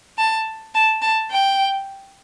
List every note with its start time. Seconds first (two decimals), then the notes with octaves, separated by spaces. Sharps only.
0.18 A5
0.75 A5
1.02 A5
1.30 G5